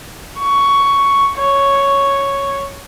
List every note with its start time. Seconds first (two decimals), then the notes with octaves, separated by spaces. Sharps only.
0.38 C#6
1.36 C#5